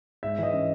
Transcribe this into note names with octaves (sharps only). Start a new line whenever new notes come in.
G#2 E5
E3 D#5
C#4